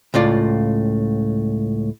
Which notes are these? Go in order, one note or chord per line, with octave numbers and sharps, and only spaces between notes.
C#2 A2 F4 D5